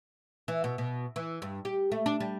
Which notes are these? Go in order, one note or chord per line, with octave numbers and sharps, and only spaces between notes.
E3
B2
B2
E3
G2
G4
A3
D4
G3